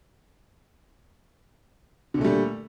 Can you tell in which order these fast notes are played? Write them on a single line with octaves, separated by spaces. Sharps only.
D3 A#2 A3 G3